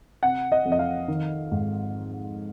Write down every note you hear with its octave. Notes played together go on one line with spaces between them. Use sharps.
C3 F#5
D#5
F2
D#5
F5
D#3
G#2